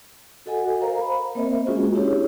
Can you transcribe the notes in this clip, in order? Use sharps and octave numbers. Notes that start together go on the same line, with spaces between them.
F#4 A4 D#5 F#5 G#5
A#4 C5 F5 A#5
B5
A#3 C4 A#4 C5 D#5 E5
G#3 A#3 C#4 F4 F#4 G#4
D4 E4 G4 G#4 C#5